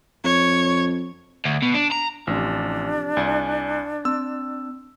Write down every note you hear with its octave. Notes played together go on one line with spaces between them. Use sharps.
F2 C#5
D2
B2
D4
A#5
A1 C3 F3 D4
C2 D5 G#5
C4 E6